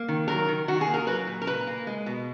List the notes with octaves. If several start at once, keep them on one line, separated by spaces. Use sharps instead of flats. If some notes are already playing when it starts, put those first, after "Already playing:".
Already playing: A#3
D#3
F#3 A#4
D#3
D#3 F#4
G#4
A#3
A#4
F#3 B4
A#2
A#4
A#2 B4
A#3
G#3
B2